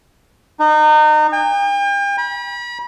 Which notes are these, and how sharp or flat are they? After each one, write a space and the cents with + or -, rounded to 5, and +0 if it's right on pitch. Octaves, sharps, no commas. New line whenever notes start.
D#4 -30
G5 +40
B5 -40